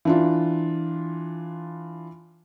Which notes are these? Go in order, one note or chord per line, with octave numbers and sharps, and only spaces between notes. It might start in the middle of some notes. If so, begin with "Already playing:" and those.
E3 D4 F4